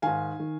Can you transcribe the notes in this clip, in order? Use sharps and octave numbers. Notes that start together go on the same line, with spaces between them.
G#2 D#3 F5 G#5
D#3